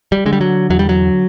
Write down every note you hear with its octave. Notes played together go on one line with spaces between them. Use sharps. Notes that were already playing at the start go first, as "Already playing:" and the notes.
G3
D3 G#3
G3
F#3
E2 F#3
G3
F#3